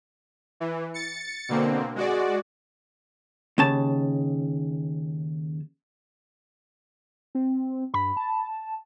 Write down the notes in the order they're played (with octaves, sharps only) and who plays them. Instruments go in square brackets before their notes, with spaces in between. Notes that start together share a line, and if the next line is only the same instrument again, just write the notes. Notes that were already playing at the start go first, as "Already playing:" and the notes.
[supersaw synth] E3
A6 C#7
B2 D3 A#3 C4
G#3 F#4 D5
[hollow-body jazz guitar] D#2 C#3 A5
[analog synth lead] C4
[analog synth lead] G2 [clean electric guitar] B5
[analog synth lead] A5